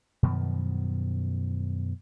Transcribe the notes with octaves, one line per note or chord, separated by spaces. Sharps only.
F#2 B2 D#3 F3